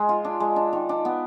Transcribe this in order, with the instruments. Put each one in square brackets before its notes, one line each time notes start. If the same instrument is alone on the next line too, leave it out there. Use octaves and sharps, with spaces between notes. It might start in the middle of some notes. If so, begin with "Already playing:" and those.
Already playing: [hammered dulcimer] G#3
F4
D4
G#3
D4
D#3
D4
B3